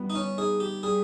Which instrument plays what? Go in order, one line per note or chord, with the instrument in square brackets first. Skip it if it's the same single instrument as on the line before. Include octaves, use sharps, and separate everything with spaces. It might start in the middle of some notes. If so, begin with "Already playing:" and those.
Already playing: [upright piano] G3 B3
[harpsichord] D#4
C#4
[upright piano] D#4 [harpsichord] G#4
[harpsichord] G4
[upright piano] G3 [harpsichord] G#4